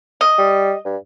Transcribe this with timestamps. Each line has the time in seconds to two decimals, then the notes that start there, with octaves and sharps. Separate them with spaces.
0.21 D#5
0.38 G3
0.85 G2